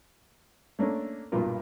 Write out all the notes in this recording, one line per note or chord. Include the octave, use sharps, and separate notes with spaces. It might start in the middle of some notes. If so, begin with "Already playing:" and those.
A3 A#3 C#4 D4 A4
B1 G2 A#2 F4 A#4